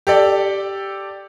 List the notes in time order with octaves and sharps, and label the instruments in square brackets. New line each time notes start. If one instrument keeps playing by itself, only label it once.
[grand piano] G4 A4 D5